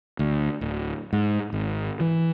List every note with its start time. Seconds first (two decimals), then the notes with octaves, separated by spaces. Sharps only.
0.19 D2
0.61 D1
1.13 G#2
1.52 G#1
2.00 E3